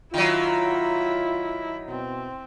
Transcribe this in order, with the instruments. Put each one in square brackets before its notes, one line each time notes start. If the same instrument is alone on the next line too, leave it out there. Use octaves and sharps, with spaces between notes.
[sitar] D#3 F#3 [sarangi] E4 [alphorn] F4
[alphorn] B2 [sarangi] C4